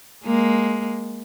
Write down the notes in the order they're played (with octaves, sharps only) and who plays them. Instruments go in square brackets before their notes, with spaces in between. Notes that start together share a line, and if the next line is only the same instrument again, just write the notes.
[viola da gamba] G#3 A#3